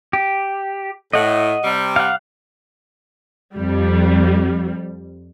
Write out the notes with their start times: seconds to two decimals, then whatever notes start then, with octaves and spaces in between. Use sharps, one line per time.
0.13 G4
1.13 A2 D#5 F#5
1.64 C3 G3
1.96 F5 F#5
3.55 F2 G3